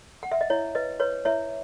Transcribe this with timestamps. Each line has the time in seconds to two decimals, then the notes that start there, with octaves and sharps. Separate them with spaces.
0.23 F#5
0.32 E5
0.41 D#5
0.50 E4 C#5
0.75 B4 D#5
1.00 B4 C#5
1.25 E4 C#5 E5